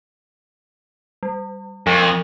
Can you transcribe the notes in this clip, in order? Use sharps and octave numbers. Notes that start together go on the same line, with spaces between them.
G3
F2 F3